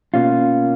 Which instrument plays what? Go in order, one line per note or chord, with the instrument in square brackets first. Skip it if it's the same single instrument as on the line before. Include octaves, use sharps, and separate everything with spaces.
[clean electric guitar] B2 A#3 C#4 F4